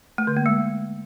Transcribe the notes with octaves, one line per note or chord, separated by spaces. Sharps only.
A3
D3
A#3
G#3